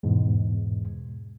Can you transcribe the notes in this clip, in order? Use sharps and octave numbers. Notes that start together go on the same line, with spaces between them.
E2 G#2 B2